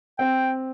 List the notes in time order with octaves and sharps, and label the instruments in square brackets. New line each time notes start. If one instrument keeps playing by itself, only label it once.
[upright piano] C4 [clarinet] G5